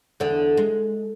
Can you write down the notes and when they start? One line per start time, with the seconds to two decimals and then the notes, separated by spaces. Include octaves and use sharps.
0.20 E2 D3 D4
0.57 G#3